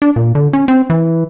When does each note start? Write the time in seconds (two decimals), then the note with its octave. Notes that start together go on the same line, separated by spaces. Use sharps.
0.02 D4
0.16 A#2
0.35 D3
0.53 C#4
0.68 C4
0.90 E3